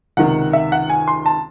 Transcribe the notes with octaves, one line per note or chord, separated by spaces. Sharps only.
C#2 C3 D#3 F#5
E5
F#5
G#5
C6
A5